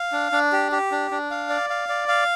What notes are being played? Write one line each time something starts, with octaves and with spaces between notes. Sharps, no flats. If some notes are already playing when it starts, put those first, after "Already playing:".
Already playing: F5
D4
D4
G4
G4
D4
D4
F5
D5
F5
D5
F5